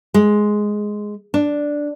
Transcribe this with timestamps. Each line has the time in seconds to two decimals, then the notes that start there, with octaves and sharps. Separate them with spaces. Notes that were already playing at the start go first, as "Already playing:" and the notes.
0.14 G#3
1.34 D4